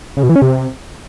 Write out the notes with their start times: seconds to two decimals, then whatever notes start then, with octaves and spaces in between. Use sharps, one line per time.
0.17 C#3
0.23 B2
0.29 E3
0.36 C#4
0.42 C3